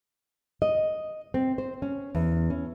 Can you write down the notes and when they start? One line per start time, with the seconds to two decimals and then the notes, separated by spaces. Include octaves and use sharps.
0.62 D#5
1.34 C4
1.58 C5
1.82 C#4
2.15 E2
2.50 C#4